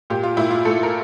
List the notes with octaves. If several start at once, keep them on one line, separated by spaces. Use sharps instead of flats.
A#2 G4
F4
A#2 E4
F4
A3 A4
A#4